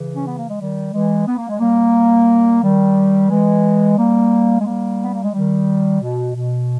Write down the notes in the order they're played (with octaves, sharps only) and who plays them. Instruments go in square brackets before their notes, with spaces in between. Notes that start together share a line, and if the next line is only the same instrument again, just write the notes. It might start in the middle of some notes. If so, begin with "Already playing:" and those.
Already playing: [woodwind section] C#3 E3
C#4
B3
A#3
G#3
D#3 G3
E3 G#3
B3
A#3
G#3
G3 A#3
D#3 G3
E3 G#3
G3 A#3
G#3
G3 A#3
B3
A#3
G#3
D#3 G3
B2
B2